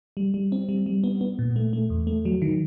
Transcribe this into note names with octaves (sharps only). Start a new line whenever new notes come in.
G3
G3
C4
G3
G3
B3
B3
A#2
A3
A3
E2
A3
F#3
D#3